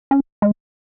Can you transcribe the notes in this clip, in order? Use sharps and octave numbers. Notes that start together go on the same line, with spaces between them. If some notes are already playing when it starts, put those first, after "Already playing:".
C#4
G#3